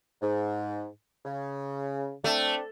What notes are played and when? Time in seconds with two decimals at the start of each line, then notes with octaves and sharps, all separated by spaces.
0.22 G#2
1.25 C#3
2.24 A3 C4 D4